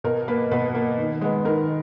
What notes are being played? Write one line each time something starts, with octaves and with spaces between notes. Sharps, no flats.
B2 A#4
A#3 B4
B2 B4
A#3
D#3
G#3 B3
D#3 A#4